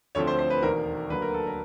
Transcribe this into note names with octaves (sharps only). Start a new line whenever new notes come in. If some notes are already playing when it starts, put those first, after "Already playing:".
D2 D3 F3 A3 C4 C#5
C5
C5
B4
E1 D#2 D#3 A#4
D2 D3 F#3 A#3 B4
A#4
A4
A#4